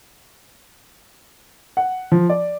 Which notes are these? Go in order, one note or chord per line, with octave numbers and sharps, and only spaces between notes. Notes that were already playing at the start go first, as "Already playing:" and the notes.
F#5
F3
D5